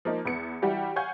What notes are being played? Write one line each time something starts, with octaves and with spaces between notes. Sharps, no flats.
F3 A#3 D#4
E2 B3 C#7
E3 G3 F#4 G4 D5
C#5 F5 F#5 G#5 G6 G#6